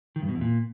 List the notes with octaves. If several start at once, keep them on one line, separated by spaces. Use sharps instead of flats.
D#3
G2
B2
E2
A#2